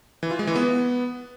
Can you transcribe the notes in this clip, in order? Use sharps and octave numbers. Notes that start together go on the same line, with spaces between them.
E3
F4
G#3
E3
B3